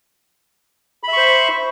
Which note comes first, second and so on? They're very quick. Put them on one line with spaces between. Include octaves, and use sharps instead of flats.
B5 E5 C#6 C5